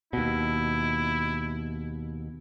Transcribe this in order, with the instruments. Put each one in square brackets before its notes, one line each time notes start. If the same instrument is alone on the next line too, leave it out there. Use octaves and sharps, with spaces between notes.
[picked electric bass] D#2 B2 [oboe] E4